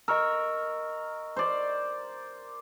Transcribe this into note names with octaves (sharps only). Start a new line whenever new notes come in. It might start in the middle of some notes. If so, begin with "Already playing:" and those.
A#4 D#5 C#6 E6
C5 D5